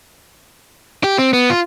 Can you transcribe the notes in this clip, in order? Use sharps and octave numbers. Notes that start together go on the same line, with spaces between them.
G4
C4
B3
F4